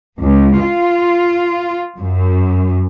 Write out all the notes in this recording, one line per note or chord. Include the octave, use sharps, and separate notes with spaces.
C#2
F4
F#2